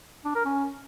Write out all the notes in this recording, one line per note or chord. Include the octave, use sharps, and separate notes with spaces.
D4
A#4
C#4